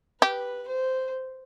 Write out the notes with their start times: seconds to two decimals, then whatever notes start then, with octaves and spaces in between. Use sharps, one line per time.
0.22 G4 B4
0.68 C5